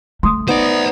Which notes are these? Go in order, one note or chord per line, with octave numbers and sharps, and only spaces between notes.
A3 C6 D#6
B3 D#4 C5 D5